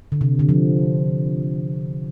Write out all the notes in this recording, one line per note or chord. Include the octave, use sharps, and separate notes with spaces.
D3
C3
D3
F3